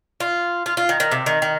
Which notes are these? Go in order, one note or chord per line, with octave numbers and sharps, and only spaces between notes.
F4
F4
F4
D#3
D#3
C3
D#3
D#3